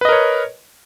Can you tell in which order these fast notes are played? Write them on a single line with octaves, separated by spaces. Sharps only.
B4 D#5 A#4 C#5